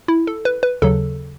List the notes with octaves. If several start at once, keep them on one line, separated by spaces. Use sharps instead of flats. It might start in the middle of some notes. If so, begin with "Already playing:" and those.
E4
A4
B4
B4
D#2 C#3 F#3 A4